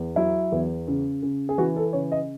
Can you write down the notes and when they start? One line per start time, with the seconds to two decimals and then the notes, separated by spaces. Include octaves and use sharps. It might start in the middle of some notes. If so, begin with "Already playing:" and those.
Already playing: E2
0.16 F#3 E4
0.52 E2
0.88 C#3
1.23 C#3
1.49 G#4
1.58 E3 F#4
1.76 A4
1.93 C#3 C#5
2.12 D#5